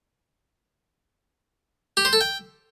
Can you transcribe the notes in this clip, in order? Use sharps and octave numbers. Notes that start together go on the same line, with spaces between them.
G4
C5
A4
G5